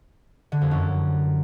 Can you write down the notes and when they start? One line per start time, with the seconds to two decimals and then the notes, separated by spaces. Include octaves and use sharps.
0.52 D3
0.61 F2
0.71 F#2